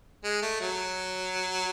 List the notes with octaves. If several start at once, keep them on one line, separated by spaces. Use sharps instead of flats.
G#3
A3
F#3